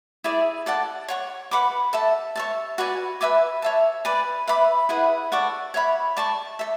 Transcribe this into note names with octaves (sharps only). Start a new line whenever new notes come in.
E4 G#4 D5 G#5
A4 D5 F#5 A5
C#5 F#5 C#6
B4 F#5 B5 D6
A4 E5 A5
C#5 E5 A5
F#4 B4 D5 G#5
B4 E5 G#5 D6
C#5 E5 A5
B4 D5 G#5
B4 E5 B5 D6
E4 G#4 B4 F#5
A4 D5 F#5 C#6
C#5 E5 B5
D5 A5 C#6
A4 E5